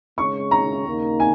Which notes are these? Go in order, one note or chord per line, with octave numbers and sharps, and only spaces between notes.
C#3 G#3 C#4 G#4 C#5 C#6
A#5
D#2 C#3 A#3 D#4 A#4
G#5